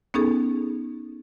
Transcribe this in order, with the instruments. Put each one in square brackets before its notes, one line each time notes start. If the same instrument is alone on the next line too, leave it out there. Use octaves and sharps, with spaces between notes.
[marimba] B3 C#4 D#4 G#4 A4